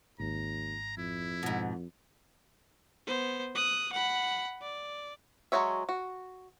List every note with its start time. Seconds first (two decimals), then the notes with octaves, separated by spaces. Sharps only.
0.20 G#1 D#2 A#5
0.97 F2 E4
1.43 G#2 B2
3.07 B3 C5
3.55 D#6 F#6
3.93 F#5 B5
4.61 D5
5.52 F#3 G#3 F#4 C#5 E5
5.89 F#4